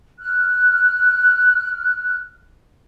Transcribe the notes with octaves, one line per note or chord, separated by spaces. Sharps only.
F6 F#6